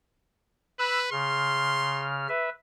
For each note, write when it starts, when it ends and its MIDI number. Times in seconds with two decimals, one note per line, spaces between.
0.79 1.09 71
0.79 0.99 83
0.79 0.99 88
0.79 0.99 90
1.12 2.27 49
1.12 2.17 84
1.12 2.27 89
2.28 2.49 71
2.28 2.49 76